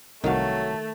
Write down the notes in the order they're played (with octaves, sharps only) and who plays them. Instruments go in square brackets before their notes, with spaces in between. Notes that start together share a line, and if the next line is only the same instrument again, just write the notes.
[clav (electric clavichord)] C2 F#4 [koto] D#3 F5 [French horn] F#3 [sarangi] A3